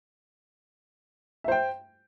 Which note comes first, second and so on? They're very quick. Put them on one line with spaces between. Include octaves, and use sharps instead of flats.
E5 C5 G5